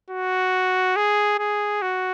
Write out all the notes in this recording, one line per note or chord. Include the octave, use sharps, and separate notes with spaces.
F#4
G#4
G#4
F#4